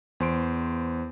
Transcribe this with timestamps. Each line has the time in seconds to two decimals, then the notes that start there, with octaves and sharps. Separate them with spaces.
0.20 E2 C5 C6 D7